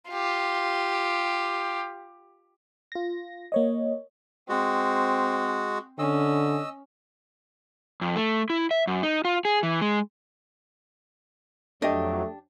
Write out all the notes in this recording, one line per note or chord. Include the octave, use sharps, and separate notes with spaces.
F4 G4
F4 A#6
A#3 C#5 D#5
G#3 C4 F#4
D3 C#4 D#5 E6
F2
A3
E4
E5
F#2
D#4
F4
G#4
E3
G#3
F2 F#3 A3 D4 G4 D#5